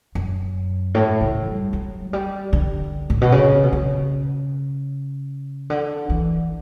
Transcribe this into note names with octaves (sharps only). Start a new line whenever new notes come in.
F#2
A2
C#3
G3
F#3
G3
D3
A2
B2
C#3
B2
C#3
D3
E3